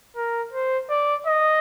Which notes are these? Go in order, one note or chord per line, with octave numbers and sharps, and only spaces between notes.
A#4
C5
D5
D#5